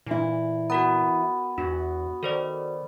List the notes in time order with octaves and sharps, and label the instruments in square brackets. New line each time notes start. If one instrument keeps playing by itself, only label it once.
[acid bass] A#2 [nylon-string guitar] E3 E4
[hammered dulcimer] B3 [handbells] F#4 A#4 A#5
[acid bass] E2 [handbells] D4 [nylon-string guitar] F#4
[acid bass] D#3 [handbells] A4 C5 D5